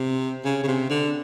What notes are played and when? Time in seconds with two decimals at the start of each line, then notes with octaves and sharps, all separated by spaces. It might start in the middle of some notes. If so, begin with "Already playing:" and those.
Already playing: C3
0.45 C#3
0.63 C#3
0.67 C3
0.90 D3